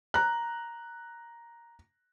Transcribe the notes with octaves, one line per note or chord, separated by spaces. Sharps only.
A#5 F#6